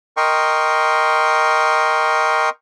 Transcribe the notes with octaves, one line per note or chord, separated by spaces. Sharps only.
A#4 D#5 G5 C6 C#6